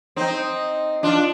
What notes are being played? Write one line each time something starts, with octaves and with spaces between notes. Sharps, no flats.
C4 D#4
D4 F4